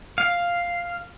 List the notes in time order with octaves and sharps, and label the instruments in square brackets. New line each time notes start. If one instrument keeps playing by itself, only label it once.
[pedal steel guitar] F5